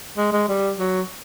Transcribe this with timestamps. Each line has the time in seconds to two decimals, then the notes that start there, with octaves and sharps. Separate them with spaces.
0.17 G#3
0.32 G#3
0.48 G3
0.79 F#3